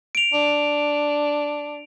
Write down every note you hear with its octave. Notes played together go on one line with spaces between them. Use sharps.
D7 F7
D4